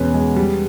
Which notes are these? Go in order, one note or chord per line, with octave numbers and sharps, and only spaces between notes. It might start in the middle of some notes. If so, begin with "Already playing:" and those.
Already playing: E2 B2 G#3 C#4 B4
G#3
G3